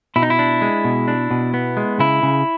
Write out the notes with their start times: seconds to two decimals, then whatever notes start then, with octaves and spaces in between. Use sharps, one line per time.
0.16 B2 E4
0.23 D#4
0.30 E4
0.39 D4
0.62 G#3
0.84 B2
1.08 D4
1.31 B2
1.54 B3
1.77 G#3
1.99 C#3 E4
2.23 C#3